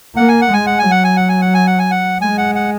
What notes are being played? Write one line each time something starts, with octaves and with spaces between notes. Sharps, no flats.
A#3 F#5
G#5
F#5
G#3 G#5
F#5
G#5
F#3
F#5
G#5
F#5
G#5
F#5
G#5
F#5
G#5
F#5
G#3 G#5
F#5
F#5